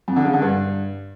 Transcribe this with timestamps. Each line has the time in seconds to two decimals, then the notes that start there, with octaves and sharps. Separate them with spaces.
0.08 F2
0.16 D3
0.25 C#3
0.33 D3
0.42 G2